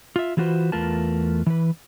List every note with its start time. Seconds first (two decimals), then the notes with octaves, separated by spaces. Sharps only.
0.16 F4 E5
0.37 E3 F#3 F4 F#4 B4 C5
0.72 E2 A3 F4 A#4 B4 A5
1.46 E3 B4